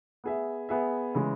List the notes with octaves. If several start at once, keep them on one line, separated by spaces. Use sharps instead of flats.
B3 G#4 E5
B3 G#4 E5
C#3 E3 G#3